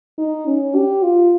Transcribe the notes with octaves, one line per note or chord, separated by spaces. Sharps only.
D#4
C#4
G4
F4